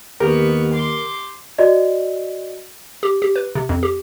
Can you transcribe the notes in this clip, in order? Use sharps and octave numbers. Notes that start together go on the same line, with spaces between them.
D#2 B3 G4 A#4 C#6
C6 D6
F#4 D5 D#5
G4
G4
B4
C3
F2
G4